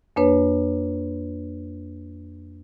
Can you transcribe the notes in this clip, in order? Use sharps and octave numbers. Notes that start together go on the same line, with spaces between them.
F2 A#3 D4 B4 C#5